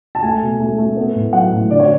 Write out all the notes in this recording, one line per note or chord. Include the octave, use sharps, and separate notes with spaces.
A5
A3 G#5
B2
A3
A3
B3
A2
F#3 F#5
A2
D3 D5
C#5